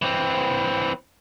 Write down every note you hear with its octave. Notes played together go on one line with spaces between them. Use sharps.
E3 C4